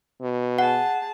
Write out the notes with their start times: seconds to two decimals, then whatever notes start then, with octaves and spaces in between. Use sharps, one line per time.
0.22 B2
0.58 G#4 F#5 A5